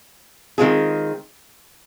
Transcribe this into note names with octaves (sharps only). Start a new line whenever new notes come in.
D#3 G#3 C4 F4 G#4